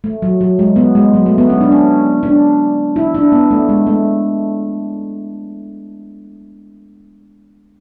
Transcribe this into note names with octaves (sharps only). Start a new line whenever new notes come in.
A3
F#3
F#3
G#3
B3
G#3
F#3
A3
B3
C#4
D4
C#4
D4
E4
D4
B3
A3
G#3
A3